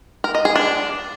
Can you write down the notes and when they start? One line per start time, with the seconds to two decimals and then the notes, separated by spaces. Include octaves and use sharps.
0.24 A#4
0.35 D#5
0.45 G#4
0.56 D4